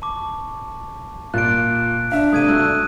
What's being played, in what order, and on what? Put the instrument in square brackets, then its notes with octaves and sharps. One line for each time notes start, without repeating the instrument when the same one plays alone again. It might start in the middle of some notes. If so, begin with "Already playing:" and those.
[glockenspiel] A5 C#6 D6
[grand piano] A#2 [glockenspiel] F#6 D7
[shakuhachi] D4 [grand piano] E5 F5
[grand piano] C3 A3 [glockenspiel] D#6 G#6 D#7
[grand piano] A3 F#4 [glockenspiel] E6 F#6